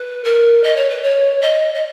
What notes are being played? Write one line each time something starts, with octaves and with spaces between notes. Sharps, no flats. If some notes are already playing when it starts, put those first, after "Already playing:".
Already playing: B4
A#4
D#5
C#5
B4
C#5
D#5
D#5